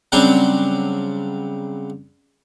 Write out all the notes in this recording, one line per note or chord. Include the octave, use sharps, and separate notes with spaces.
C#3 F#3 G3 C4 D4